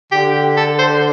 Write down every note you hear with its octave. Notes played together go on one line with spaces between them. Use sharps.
D3 G4
A4
C5